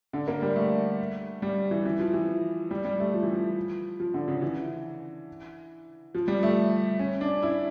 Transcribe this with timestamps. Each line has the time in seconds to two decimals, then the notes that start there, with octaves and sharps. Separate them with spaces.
0.13 D3
0.28 A#3
0.42 G3
0.56 A3
1.42 G3
1.71 E3
1.85 E3
1.99 F3
2.14 E3
2.71 G3
2.84 G3
3.00 A3
3.14 F3
3.23 E3
3.32 F3
4.00 F3
4.14 D3
4.28 C#3
4.42 E3
6.15 F3
6.28 G3
6.43 A3
6.99 C#4
7.21 D4
7.43 E4